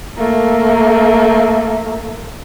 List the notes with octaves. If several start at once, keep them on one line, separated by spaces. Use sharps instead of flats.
A3 A#3